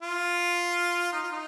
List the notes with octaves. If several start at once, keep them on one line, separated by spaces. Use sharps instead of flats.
F4
D#4
F4
D#4